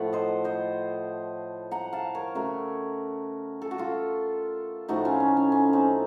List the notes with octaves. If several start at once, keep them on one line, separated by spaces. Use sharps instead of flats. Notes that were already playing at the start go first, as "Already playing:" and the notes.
Already playing: A2 F3 A3 F#5
C5 D#5
C5 D#5
F#5 A#5
F5 A5
A#4 C#5
C#3 A3 F#4 A#4
A4
F#4
F4 A4
A2 F3 A3 D#4 F#4
C#4 F4
C#4
C#4
C#4
C4 D#4